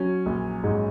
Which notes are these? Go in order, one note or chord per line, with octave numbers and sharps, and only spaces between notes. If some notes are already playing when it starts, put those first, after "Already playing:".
Already playing: F#3 C#4
A#1
G#2